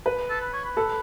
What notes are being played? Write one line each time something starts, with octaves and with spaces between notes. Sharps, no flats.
B4
A4
B4
C#5
B4
A4